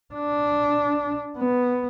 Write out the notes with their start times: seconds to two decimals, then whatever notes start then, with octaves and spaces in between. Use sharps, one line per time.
0.14 D4
1.38 B3